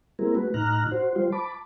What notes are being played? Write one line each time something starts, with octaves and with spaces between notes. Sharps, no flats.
G3 A#3 C4 E4 G#4 A#4
A3 F#4 B4
A2 D#4 A#5 F6 F#6
F#4 C5
G3 F4 C5
A5 B5 D6